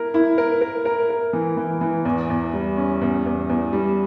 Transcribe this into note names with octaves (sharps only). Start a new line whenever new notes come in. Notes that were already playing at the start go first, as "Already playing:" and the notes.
Already playing: E4 A#4
E4
A#4
A#4
A#4
A#4
E3
E3
E3
E2
E2
G3
C#4
E2
E2
E2
G3